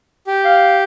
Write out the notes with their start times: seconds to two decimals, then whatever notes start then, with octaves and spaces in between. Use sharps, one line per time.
0.27 G4
0.45 F5